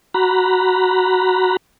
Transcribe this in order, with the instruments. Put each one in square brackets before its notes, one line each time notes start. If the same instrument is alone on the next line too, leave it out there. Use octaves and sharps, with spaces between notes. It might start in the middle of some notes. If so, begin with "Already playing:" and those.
[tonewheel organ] F#4 A#5 B5